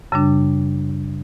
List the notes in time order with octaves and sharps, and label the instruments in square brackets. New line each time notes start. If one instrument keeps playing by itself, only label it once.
[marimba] F#2 C#3 G3 D4